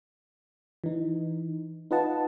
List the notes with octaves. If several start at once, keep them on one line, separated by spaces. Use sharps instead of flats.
E3 D#4
D#4 F4 B4 D#5 F#5 A5